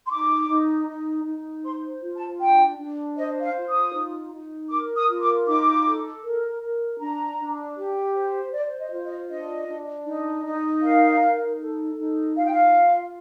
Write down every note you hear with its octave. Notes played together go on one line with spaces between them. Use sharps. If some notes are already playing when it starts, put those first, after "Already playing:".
C6
D#4 D6
D#4
D#4
D#4
C5 C6
F4
A5
D4 G5
D4
C5 D#5
F5
F4
D#6
D#4
D#4
A#4 D6
D#6
F4
D6
D#4 D6
A4
A#4
A#4
D4 A#5
D4
G4
C5
C5 D5
D#5
F4
D#5
D4 D#5
D4
D#4
D#4
A#4 F5
D#4
A4
D#4
F4 F5
G5
F5